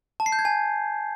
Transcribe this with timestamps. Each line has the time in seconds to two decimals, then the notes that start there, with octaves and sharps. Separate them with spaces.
0.20 A5
0.26 C7
0.32 G6
0.39 G#6
0.45 G#5